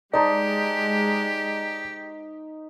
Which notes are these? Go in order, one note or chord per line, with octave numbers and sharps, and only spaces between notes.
G#3 D#4 G4 C5 D5 A5 A#5